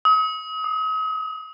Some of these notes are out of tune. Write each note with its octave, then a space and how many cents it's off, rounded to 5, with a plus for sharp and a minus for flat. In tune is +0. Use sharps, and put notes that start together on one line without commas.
D#6 +40
D#6 -15